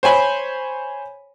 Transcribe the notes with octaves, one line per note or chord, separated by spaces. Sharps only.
C5 C#5 G#5 B5